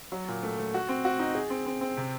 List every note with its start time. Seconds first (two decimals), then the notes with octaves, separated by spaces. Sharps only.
0.12 F#3
0.28 A#2
0.43 A3
0.58 A3
0.74 F#4
0.89 C4
1.05 F#4
1.19 D#4
1.35 G#4
1.50 C4
1.66 C4
1.81 C4
1.97 C3